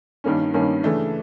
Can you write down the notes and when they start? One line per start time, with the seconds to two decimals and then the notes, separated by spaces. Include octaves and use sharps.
0.24 G2 D#3 G3 A#3 C#4
0.54 G2 D#3 G3 A#3 C#4
0.83 C#3 E3 A3 D4